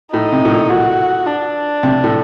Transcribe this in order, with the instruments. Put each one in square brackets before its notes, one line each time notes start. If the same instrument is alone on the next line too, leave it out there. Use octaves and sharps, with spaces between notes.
[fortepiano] A2 [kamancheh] D#4
[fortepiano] C3
A2
A#2
[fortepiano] A#2 [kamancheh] F#4
[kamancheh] D4
[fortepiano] C3
A2